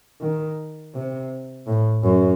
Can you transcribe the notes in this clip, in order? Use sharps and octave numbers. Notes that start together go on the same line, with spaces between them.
D#3
C3
A2
F#2